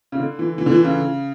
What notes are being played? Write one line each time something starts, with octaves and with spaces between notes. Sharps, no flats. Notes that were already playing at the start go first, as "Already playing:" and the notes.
C#3
D3
E3
E3
D3
E3
C#3